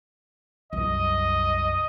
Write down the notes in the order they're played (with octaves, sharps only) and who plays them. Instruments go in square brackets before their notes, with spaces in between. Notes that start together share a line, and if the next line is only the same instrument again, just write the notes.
[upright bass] C2 F#2 [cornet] D#5